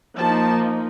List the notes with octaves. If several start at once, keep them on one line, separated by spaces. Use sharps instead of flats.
F3 A#3 D#4 A5